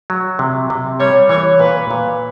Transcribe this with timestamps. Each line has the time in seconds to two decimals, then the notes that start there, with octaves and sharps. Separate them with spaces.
0.10 F#3
0.39 C3
0.70 C3
1.00 G3 C#5
1.29 E3 C#5
1.60 A#2 B4
1.91 A#2